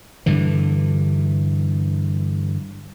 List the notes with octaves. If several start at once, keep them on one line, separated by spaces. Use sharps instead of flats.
G2 D3 E3